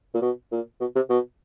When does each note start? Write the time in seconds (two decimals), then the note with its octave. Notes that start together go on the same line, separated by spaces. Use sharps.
0.14 A#2
0.21 B2
0.51 A#2
0.80 B2
0.95 C3
1.09 B2